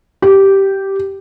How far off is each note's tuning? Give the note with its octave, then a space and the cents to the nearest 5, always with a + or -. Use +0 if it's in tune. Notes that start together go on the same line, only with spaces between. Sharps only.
G4 -10